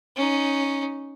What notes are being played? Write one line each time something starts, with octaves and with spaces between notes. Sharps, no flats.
C#4 D#4